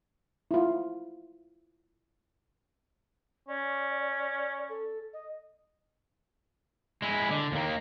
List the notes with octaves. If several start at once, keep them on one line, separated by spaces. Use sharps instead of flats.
E4 F4
C#4 D5
A4
D#5
G#3 E4
D3
D#2 A#3